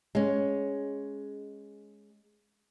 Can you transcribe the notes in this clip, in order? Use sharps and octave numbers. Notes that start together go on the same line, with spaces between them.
G#3 C#4